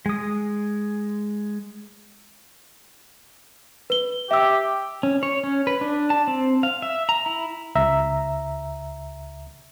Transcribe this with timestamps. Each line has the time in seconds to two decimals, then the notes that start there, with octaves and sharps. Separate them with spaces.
0.06 G#3 D#6
3.90 B4 G7
4.31 G4 E5 E6
5.03 C#4
5.23 C#5
5.44 C#4
5.67 B4
5.81 D4
6.10 A5
6.28 C4
6.63 F5
6.82 E5
7.09 A#5
7.26 E4
7.75 C#2 E5 A#5